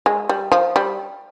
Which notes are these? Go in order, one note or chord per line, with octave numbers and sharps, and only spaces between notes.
G#3
G3
F3
G3